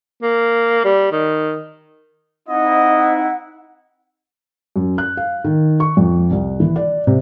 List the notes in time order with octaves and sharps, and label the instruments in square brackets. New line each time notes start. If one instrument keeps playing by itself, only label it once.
[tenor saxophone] A#3
G3
D#3
[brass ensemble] C4 D#4 E4 [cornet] D#5 [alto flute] F#5
[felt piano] F#2
F#6
F5
D#3
C#6
F2
C2
E3
D5
C3